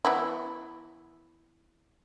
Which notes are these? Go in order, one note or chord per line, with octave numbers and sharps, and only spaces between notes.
E3 B3 E4